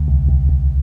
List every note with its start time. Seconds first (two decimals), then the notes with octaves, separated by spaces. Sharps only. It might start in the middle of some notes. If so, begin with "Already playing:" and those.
Already playing: D2
0.08 C2
0.29 C2
0.49 C2